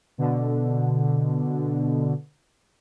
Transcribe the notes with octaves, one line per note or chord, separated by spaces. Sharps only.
B2 D3